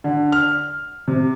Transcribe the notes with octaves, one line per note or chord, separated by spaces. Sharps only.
D3
F6
C3